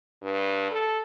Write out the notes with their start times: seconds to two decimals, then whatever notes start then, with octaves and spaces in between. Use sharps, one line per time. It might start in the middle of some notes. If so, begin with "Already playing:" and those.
0.22 G2
0.71 A4